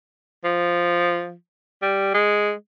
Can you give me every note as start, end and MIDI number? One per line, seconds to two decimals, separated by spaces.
0.44 1.34 53
1.82 2.09 55
2.14 2.53 56